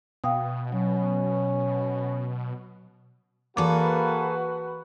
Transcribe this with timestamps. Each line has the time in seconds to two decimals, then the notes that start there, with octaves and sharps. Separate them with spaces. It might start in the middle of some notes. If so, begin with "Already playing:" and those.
0.24 B2 F5 G5 D#6
0.72 F#3 C#4
3.57 E3 A#3 F#4 G#4 A4 B4 D6